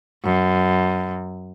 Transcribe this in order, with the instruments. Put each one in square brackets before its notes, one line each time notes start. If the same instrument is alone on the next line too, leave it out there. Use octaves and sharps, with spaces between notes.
[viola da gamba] F#2